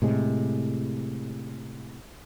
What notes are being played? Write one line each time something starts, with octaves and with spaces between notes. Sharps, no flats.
A2 C3 G#3